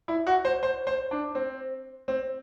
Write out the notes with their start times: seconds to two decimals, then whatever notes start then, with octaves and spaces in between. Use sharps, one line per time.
0.08 E4
0.27 F#4
0.45 C5
0.63 C5
0.87 C5
1.11 D4
1.35 C4
2.08 C4